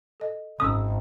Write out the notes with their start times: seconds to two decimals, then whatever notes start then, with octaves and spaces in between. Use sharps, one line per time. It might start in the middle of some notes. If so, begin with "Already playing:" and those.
0.20 A4 D#5
0.60 G#1 C#4 D#6 E6